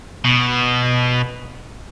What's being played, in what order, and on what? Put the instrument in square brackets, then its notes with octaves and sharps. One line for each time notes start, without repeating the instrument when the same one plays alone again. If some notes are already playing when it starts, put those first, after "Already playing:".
[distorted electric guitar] B2